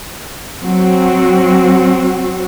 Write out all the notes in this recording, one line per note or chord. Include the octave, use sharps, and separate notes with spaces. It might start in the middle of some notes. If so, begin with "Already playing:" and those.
F#3 C4 F#4